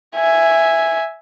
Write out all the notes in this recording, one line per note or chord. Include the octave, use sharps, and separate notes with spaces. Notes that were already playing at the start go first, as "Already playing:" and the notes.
E5 G#5